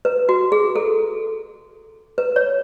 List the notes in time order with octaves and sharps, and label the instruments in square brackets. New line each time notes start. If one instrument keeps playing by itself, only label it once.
[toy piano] B4
F#4
G#4
A4
B4
C#5